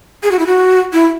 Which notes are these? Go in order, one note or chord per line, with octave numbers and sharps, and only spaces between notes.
G#4
F#4
E4
F#4
E4